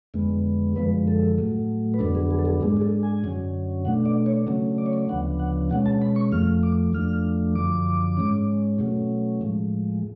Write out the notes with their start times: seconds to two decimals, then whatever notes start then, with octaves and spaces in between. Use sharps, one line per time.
0.14 F2 D3 G#3 B3
0.76 F#2 D3 F3 G#3 B4
1.08 A4
1.38 A2 F#3 A3
1.94 B4
1.99 F2 D3 F#3 B3 D4 A4
2.15 G#4
2.31 G#4
2.39 A4
2.45 G#4
2.61 G#2 G#3 D4 G#4
2.77 G#4
2.81 A4
3.03 G#5
3.24 F#2 D3 F#3 C#4
3.85 B2 A3 D4 F#5
4.06 D5
4.26 C#5
4.47 C#3 F#3 A3 C#4
4.78 D5
4.86 C#5
4.93 D5
5.09 D2 C#3 F3 B3 D4 F#5
5.39 F#5
5.70 B2 G#3 C#4 F#5
5.86 A5
6.02 B5
6.16 C#6
6.32 F2 F3 A3 F6
6.63 D6
6.93 F2 F3 A3 D4 F6
7.55 F#2 D3 F3 D6
8.17 G#2 G#3 C#4
8.79 B2 F#3 A3 C#4
9.41 A2 F3 G#3